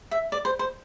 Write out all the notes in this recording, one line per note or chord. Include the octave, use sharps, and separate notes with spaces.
E5
D5
C5
C5